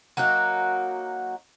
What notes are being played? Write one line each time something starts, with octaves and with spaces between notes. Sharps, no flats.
F#3 A#3 D#4 F#4